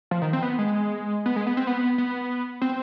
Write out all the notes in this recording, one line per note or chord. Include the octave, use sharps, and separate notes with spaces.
F3
D#3
C4
B3
G#3
B3
G#3
B3
C4
B3
B3
C4